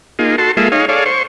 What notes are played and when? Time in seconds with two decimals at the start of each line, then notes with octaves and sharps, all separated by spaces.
0.19 A#3 D#4 F4 G#4
0.38 F#4 A4 A5 C6
0.57 G#3 A#3 F4 G#4 A4 E5
0.72 D#4 G#4 C#5 F5
0.89 G#4 A4 C#5 D5 F5
1.06 C5 C#6